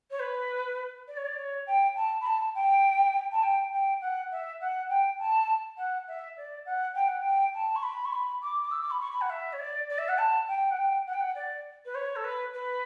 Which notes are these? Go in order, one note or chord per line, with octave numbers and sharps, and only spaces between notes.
C#5
B4
D5
C#5
D5
C#5
G5
A5
B5
A5
G5
A5
G5
G5
F#5
E5
F#5
G5
A5
F#5
E5
D5
F#5
G5
F#5
G5
A5
C#6
B5
C#6
B5
D6
D6
E6
D6
B5
C#6
B5
F#5
E5
C#5
D5
D5
E5
F#5
A5
G5
F#5
G5
F#5
G5
F#5
D5
B4
C#5
A4
B4
B4